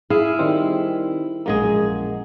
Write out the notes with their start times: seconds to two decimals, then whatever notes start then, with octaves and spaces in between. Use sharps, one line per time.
0.10 E4 G#4 F5
0.39 D#3 G3 C4
1.46 A#1 F#2 G#3 A#3 G#4